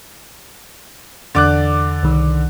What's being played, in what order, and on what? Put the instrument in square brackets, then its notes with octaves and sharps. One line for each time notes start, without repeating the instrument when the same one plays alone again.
[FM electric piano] E2 A6 [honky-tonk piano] D3 D6 F#6
[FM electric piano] C2 D#3